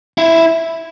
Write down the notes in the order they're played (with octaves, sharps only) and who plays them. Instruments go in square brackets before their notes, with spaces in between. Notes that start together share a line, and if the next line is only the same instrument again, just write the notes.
[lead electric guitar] E4